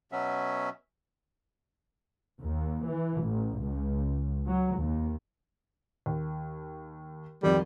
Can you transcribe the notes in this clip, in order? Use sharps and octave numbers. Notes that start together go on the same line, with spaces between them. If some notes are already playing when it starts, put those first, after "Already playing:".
B2 F#3 B3 C#4 E5
D#2
E3
A1
C#2
F#3
D#2
D#2
G#1 F2 G3